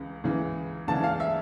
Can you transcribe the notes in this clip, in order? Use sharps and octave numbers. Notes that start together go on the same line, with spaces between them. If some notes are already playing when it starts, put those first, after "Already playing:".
Already playing: C#2 C#3 E3
C#2 C#3 E3
C#2 C#3 E3 A5
F5
E5